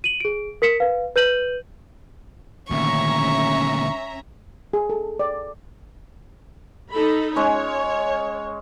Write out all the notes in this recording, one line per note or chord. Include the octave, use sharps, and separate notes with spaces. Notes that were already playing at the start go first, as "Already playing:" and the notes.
D#7 F#7
G#4 D7
A#4 B6 C#7 E7
B4 F5
B4 G6 D#7 F#7
D2 A#2 D#3 C#4 E5 A#5 C#6
G#4
A4
D5
D#4 A4 B5
G#3 C#4 C#5